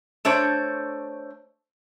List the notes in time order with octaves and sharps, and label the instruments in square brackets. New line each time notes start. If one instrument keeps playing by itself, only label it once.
[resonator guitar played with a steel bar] A3 D4 C5 C#5